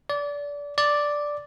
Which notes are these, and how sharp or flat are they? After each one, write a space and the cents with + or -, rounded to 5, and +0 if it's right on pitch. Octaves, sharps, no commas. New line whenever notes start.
D5 -25
D5 +0